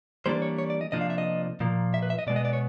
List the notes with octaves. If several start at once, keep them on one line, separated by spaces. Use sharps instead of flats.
E3 G3 A#3 D4 C5
C#5
C#5
D5
D#5
C3 F3 A#3 D4 F4 D#5
F5
E5
D#5
A#2 F3 A#3
E5
B4
E5
D#5
B2 G#3 B3 D5
D#5
D5
C#5